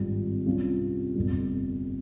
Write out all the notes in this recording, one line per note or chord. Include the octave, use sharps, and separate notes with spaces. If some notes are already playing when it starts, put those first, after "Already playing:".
Already playing: G#1 G2 G3 C4 F4
C2 C3 G3 C#4 F4
G1 F2 C3 G3